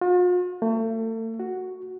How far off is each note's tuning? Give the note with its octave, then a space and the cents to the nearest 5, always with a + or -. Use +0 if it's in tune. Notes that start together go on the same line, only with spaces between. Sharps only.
F4 +45
A3 +35
F#4 +0